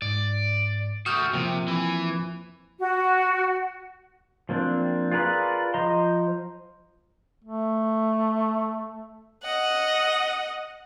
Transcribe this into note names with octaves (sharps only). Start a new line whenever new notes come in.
G#2 D5
A3 F#4 D#6 F6 G6
C3 F3 A#3 C4
E3
F#4
F3 A#3 C4 D4
F4 G#4 A#4 B4 D5
F3 C5 D#5 A#5 C6
A3
D#5 F#5